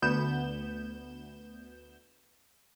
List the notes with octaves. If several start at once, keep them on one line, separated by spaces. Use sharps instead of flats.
D2 B3 G6 E7